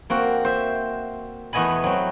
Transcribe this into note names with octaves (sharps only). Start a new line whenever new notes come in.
A#3 C4 F#4
C5 E5
E2 A3 B3 D#5 G#5 B5
F#3 C4